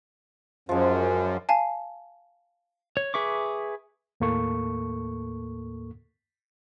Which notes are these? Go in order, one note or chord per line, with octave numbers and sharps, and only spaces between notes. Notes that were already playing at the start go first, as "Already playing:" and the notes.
F#2 F3 G#3
F5 G#5 A5
C#5
G#4 B4 E5 C#6 D6
D#2 A2 A#3 A4 C#6